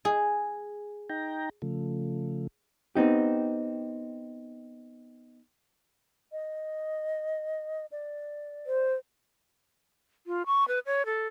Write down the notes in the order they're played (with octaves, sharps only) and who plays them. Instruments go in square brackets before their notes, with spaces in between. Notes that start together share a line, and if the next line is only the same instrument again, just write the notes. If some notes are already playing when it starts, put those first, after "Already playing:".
[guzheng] G#4
[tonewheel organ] D#4 G5 A#5
C#3 F3 A3
[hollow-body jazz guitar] B3 C4 D#4 G4
[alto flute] D#5
D5
[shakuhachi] C5
[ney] F4
C#6
B4
C#5
A4